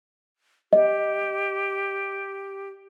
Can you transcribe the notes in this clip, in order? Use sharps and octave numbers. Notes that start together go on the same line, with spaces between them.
G4 D#5